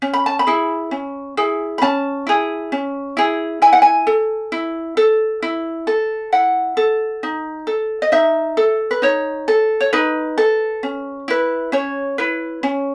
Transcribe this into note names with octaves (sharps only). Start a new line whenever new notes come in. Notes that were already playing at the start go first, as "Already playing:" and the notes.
C#4
B5
A5
B5
E4 G#4
C#4
E4 G#4
B5
C#4 A5
E4 G#4
C#4
E4 G#4
E4 G#5
F#5
G#5
A4
E4
A4
E4
A4
E4 F#5
A4
D#4
A4
D#5
D#4 E5
A4
B4
D#4 C#5
A4
C#5
D#4 B4
A4
C#4
E4 B4
C#4 C#5
E4 B4
C#4